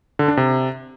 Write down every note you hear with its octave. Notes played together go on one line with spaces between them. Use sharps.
D3
D4
C3